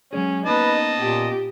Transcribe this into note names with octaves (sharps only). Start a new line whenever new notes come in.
F#3 G#3 C#4 G#4
A#3 B3 C#4 D#4 B4 D#5 A5
A#2 G4